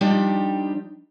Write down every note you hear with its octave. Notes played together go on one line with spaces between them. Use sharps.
F3 G3 D4 D#4 G4